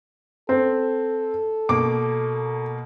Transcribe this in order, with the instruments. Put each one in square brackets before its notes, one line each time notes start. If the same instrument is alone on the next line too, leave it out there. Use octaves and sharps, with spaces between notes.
[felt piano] C4 [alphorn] A4
[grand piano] B2 A#3 [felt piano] D6